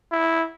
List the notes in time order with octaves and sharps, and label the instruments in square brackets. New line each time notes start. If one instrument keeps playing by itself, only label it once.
[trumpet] E4